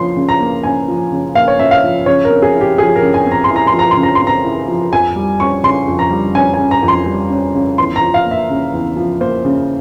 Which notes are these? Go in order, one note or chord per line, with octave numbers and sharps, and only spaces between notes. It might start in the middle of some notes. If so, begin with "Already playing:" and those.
Already playing: C#3 F3 A#3 C#4 C6
C#3
A#5
A#3
C#4 G#5
F3
C#3
A#3 F5
C#5
C#4 E5
F5
F3
C#3 C#5
A#4
C4
G#4
E4
G4
F3 G#4
A#4
C#3
G#5
C4
A#5
C6
E4
A#5
C6
F3
A#5
C6
C#3
A#5
C6
C4
A#5
E4
F3
F2 G#5
G3
C#4 C#6
C#3 C6
F2
A#5
G3
C#4 G#5
G#5
C#3
A#5
F2
C6
G3
C#4
C#3
E2 C6
A#5
F3
F5
A#3
E5
C#3
E2
F3
A#3 C5
C#3